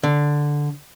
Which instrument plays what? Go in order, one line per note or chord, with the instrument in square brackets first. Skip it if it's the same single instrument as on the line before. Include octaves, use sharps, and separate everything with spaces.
[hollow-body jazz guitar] D3